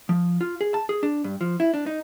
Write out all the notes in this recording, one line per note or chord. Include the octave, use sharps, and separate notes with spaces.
F3
F4
G#4
A5
G#4
D4
G2
F3
E4
D4
D#4